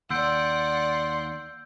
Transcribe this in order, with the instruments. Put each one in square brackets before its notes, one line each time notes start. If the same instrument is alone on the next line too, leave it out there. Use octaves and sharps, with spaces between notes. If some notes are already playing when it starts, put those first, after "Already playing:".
[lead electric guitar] D#2 [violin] D5 F#5 [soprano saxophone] C6 [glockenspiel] E6 G6 D7